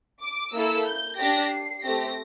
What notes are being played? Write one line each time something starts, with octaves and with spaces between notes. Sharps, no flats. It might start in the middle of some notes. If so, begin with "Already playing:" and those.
D6
A#3 E4 A4 E6
G6
D4 G4 A#6
C7
A3 C4 G4 A#6